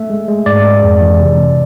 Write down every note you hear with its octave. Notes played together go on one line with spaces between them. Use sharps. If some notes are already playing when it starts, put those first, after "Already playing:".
Already playing: A3 E5
G#3
G#3
G#2 D5
G#3
F2
E3
C3
C3